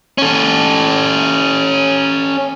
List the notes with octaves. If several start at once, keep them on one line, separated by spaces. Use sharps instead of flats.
C#4 A4